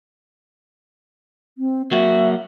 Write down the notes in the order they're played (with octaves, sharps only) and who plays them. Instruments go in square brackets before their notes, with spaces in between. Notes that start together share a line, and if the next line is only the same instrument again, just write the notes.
[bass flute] C4
[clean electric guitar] F#3 A#3 F#4 [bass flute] E5